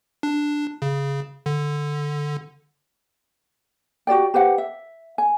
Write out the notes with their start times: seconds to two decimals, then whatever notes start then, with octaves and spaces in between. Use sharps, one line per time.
0.23 D4
0.82 C#3
1.46 D3
4.07 F#4 G4 D5 G5
4.34 G4 B4 C5 F#5
4.58 E5
5.18 G#5